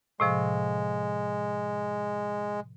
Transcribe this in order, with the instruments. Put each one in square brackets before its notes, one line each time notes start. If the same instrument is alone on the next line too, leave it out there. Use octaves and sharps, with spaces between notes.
[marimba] A2 C3 F3 [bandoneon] G#3